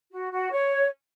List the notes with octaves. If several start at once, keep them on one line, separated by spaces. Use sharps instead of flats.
F#4
F#4
C#5